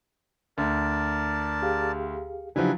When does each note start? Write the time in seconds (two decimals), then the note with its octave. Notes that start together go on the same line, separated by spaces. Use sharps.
0.58 D2 A#4 D5 A5
1.62 G4 G#4 F5
2.56 C#3 F3 F#3 D4 E4 G4 B4 G#5